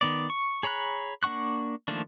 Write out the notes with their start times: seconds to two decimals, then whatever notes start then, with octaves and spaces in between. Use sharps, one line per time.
0.01 D#3 B3 D5
0.30 C#6
0.63 G#4 C#5 A#5 B5 F#6
1.23 A#3 D4 F#5 C#6 F#6
1.88 D#3 F3 A3 A#3 D4